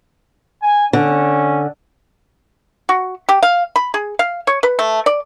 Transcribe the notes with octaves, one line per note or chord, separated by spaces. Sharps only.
G#5
D3 C#4
F#4
G4
F5
B5
G#4
F5
C#5
B4
A3
D5